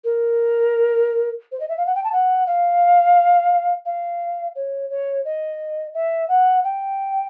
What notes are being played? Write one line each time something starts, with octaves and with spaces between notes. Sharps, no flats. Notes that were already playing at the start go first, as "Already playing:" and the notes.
A#4
C5
D#5
E5
F5
F#5
G5
A5
F#5
F5
F5
C#5
C#5
D#5
E5
F#5
G5